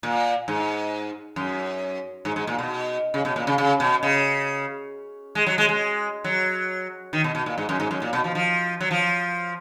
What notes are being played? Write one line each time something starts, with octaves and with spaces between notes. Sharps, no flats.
A#2
G#2
F#2
G#2
G#2
A#2
B2
C#3
B2
A#2
C#3
C#3
B2
C#3
G#3
F#3
G#3
G#3
F#3
D#3
B2
B2
A#2
G#2
F#2
G#2
F#2
A#2
B2
F3
F3
F#3
F3